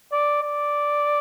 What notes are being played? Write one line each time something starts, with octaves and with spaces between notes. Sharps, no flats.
D5
D5